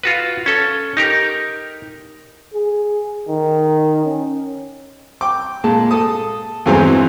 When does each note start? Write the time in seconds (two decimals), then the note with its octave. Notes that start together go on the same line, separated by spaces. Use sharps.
0.03 F4 F#4 B4
0.46 C#4 A4
0.97 D#4 G4 A#4
2.54 G#4
3.28 D#3
4.05 C#4
5.21 G5 D6
5.64 A#2 G#3 A5
5.91 A4 A5 D#6
6.66 E2 G2 E3 F#3 G#3 C4